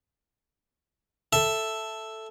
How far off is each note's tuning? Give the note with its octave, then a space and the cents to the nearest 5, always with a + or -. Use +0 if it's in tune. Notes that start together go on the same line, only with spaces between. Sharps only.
A4 +0 E5 +0